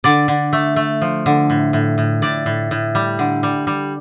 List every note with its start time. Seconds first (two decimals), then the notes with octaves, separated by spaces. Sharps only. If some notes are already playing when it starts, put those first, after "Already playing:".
0.04 D3 D5
0.28 D3
0.53 A3
0.76 A3
1.02 F3
1.26 D3
1.50 A2
1.73 A2
1.98 A2
2.22 A2 D5
2.46 A2
2.71 A2
2.95 G3
3.19 D3
3.43 G3
3.67 G3